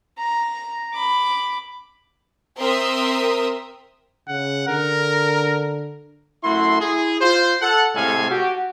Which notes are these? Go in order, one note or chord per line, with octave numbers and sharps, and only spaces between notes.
A#5
B5 D6
C4 A#4 E5 C6 D#6
C#3 F#5
D3 A#4
F#2 A3 E4 F#4 C6
E4 G#4
F4 C5
A4 F#5
A2 C3 G#3 A4 F5 G#5
F#4 G4